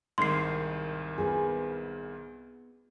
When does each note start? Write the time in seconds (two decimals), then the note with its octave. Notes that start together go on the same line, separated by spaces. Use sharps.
0.18 C2 G#2 D#3 C6 C7
1.18 B3 F4 G#4